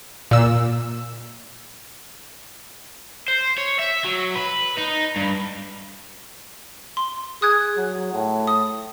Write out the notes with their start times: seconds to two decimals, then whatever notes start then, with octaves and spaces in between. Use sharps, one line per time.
0.31 A#2 E6
3.28 C5
3.58 C#5
3.79 E5
4.05 F#3
4.35 B4
4.78 D#4
5.16 G2
6.97 C6
7.42 G#4 D#6 F#6 G#6
7.77 F#3
8.13 A2
8.47 D#6